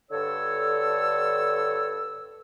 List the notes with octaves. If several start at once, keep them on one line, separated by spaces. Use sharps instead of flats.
G2 D3 A4 C#5 E6